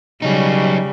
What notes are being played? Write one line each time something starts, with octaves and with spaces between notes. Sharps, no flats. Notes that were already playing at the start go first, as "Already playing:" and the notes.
C#3 F#3 G3 D#4